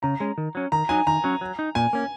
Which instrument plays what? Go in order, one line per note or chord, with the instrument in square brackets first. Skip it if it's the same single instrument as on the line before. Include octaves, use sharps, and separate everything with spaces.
[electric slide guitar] C#3 [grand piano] A#5
[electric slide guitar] G#3 C#4
D#3
F#3 C#4
[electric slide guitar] D#3 [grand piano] A#5
[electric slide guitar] F#3 D#4 [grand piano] G#5
[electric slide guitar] D#3 [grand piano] A#5
[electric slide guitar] F#3 C#4
F#3
D#4
[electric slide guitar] A#2 [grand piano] G#5
[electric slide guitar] A#3 C#4